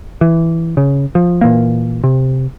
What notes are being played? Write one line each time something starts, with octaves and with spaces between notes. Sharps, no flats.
E3
C#3
F3
A#2 E3 A#3
C3